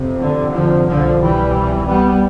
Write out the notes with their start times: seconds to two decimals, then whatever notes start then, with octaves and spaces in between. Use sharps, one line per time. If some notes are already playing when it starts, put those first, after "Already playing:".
Already playing: F2 C3
0.20 D3
0.53 D3 F3
0.86 C2 B2 D3 F3
1.20 E3 G3
1.86 G3 B3